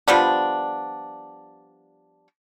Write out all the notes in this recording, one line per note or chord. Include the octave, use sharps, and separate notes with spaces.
F3 G3 B3 D4